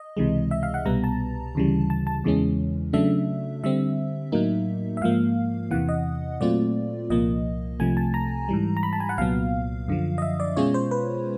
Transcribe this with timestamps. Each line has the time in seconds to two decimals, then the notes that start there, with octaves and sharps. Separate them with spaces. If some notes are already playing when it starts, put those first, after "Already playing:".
Already playing: D#5
0.17 C#2 C3 E3 G#3
0.51 E5
0.63 F5
0.74 F#5
0.85 C2 B2 G3 B3 A#5
1.04 A5
1.55 D2 C#3 E3 G3
1.90 A5
2.07 A5
2.24 E2 C#3 E3 G#3 C#4
2.93 C#3 F#3 A3 D4 E5
3.64 D3 G3 C4 E5
4.32 A2 F#3 A#3 D#4
4.97 E5
5.01 G#2 F3 A#3 F5
5.71 E2 C3 E3 F#5
5.89 D#5
6.40 A#2 F#3 A3 C4 F4 D5
7.10 C2 A#2 F3 A#3 D#5
7.80 C2 C3 F3 A3 G#5
7.97 A5
8.14 A#5
8.49 G#2 E3 G3
8.77 A#5
8.83 B5
8.93 A5
9.00 G#5
9.09 F#5
9.18 C2 A#2 F#3 B3 F5
9.88 F#2 D3 F3
10.18 D#5
10.22 E5
10.40 D5
10.56 B2 G#3 C#4 F4 C#5
10.74 C5
10.91 B4